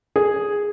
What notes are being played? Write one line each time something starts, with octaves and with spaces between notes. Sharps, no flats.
G#4